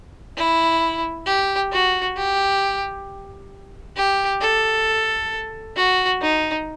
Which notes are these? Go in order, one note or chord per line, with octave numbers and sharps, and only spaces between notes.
E4
G4
F#4
G4
G4
A4
F#4
D#4